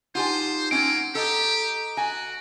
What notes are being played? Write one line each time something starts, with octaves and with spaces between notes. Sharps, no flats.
D#4 F4 G4 C5 F#5 G#5 A5
A#3 C4 C#4 D7
G4 A4 D#5 A#5 D#6
F#4 G#5